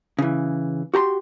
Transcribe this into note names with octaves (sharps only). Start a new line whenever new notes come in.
C#3 E3
F#4 G4 A#5 C6